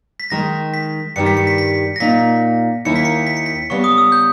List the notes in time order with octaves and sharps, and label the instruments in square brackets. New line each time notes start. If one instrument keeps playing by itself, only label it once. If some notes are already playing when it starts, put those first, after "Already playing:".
[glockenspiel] B6
[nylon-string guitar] D#3 G#3 D#4 [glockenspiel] A#6
[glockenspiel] B6
[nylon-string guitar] G2 D#3 G3 [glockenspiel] C#7
[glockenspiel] B6
C#7
B6
B6
A#6
[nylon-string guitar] A#2 A#3 D#4 [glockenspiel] B6
[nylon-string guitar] D#2 D#3 A#3 E4 [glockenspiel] C#7
[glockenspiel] B6
C#7
B6
C#7
B6
[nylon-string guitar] C#3 G3 B3 [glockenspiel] C#6
[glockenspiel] D#6
E6
G6